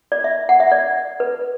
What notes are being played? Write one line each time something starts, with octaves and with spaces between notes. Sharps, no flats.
D5
E5
F#5
E5
D5
B4